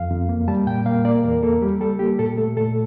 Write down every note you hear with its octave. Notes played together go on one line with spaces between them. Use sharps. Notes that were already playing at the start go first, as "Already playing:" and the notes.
Already playing: F2 F5
F2
A#3
G3 A5
A#2 G5
A#3 F5
A#3 D5
E2 A#4
A#3 A4
G3 G4
G3 A4
A#3 G4
A#2 A4
A3 A4
A#2 A4